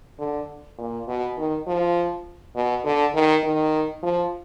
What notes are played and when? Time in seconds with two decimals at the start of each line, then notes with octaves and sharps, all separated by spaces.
0.19 D3
0.78 A#2
1.08 B2
1.37 D#3
1.67 F3
2.55 B2
2.85 D3
3.14 D#3
3.44 D#3
4.03 F3